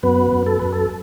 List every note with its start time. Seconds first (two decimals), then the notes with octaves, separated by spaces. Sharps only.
0.03 F#2 B3 B4
0.32 F#2
0.46 A4
0.59 F#2 B4
0.73 A4